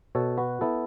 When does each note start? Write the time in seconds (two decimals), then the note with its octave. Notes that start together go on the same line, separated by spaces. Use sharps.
0.15 B2 A4 C#5
0.38 F#4 B4
0.61 B3 E4 A4